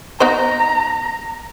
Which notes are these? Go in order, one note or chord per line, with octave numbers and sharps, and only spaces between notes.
B3 D#4 C5 A#5